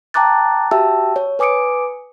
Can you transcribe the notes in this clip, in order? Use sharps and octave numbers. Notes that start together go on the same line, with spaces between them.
G5 A5 A#5 D6 F#6 A6
F#4 G4 E5 G5 A5 E6
C#5
B4 G#5 D6 D#6 C#7 D7